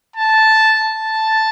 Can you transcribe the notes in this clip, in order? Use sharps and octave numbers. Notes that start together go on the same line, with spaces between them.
A5
A5